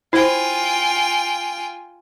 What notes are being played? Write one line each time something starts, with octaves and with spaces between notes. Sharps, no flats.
E4 F4 C5 G5 G#5